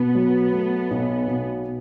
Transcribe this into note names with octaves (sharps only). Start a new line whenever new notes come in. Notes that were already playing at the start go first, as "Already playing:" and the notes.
Already playing: B2 B3
F#3
A3
B1
B2